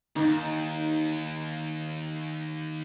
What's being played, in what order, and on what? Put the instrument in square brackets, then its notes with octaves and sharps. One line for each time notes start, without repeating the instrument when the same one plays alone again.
[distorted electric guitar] D#2 [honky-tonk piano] D#4